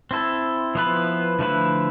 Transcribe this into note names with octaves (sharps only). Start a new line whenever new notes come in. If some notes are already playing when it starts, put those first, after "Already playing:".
C4 E4 A4
F3 B3 E4 B4
D3 F3 A3 E4 B4